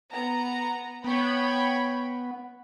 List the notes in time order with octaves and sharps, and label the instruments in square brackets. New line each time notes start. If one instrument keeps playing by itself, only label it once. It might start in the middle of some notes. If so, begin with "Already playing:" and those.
[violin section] B3 A#5
[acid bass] B3 [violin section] C#5 G5 B5